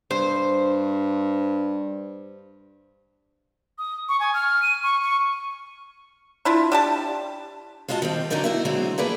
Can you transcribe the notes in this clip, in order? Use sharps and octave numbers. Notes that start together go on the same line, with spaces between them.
G2 C5
D#6
C#6
G#5
F6
D#7
C#6
C#6
D4 E4 F4
D4 G4 A5
G#3 F4 F#4 D#5 A5
D#3 G3 C4
E2 D3 F#3 D#4 A#4 D5
E4 F#4 E5
D3 F#3 G#3 A3 B3 C4
F3 A#3 G#4 A4 B4 D5